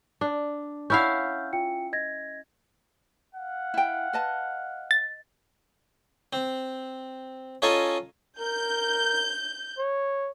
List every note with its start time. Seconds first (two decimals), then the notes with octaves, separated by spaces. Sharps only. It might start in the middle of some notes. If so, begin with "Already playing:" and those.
0.21 D4
0.90 C#4 E4 F5 F#5 F6 G6
1.53 F4 G5 C#7
1.93 D#5 G#6 A#6
3.34 F5 F#5
3.74 E4 G5
4.13 B4 D#5 A5
4.91 A6
6.33 C4
7.62 C#4 F4 A4 D#5 G#5 A#5
8.39 A#4 G6
9.78 C#5